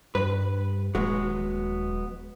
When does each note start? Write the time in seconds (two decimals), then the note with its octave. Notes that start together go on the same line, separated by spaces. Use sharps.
0.15 G2 B4
0.95 D#1 F#3 G#3 B3